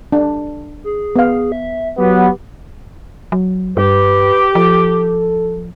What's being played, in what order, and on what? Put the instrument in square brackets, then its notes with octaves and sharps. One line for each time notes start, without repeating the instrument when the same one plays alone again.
[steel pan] D4
[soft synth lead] G#4
[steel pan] B3 F5
[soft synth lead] E5
[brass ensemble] F#3 B3 [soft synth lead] G4
[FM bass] F#3
[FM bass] G2 [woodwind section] G4 [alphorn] B4
[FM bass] F3 [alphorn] A4